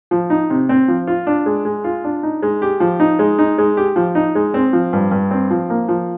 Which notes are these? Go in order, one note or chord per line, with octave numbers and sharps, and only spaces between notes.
F3
D#4
C3
C4
F3
F4
D4
G#3
G#3
F4
D4
D#4
G#3
G4
F3
D#4
G#3
D#4
G#3
G4
F3
D#4
G#3
C4
F3
G2
G2
C4
F3
A#3
F3